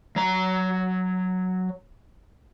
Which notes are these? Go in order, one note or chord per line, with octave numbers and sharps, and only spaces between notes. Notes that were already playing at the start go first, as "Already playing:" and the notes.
F#3 A#5